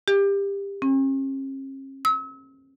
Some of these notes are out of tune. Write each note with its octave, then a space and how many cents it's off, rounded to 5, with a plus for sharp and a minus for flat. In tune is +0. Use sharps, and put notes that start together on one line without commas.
G4 +20
C#4 -45
E6 -40